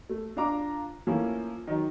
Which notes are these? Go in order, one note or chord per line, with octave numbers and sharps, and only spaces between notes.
A3
D4 F4 F5 A#5 D6
F3 A3 A#3 C#4 E4 F4
D#3 F#3 D#4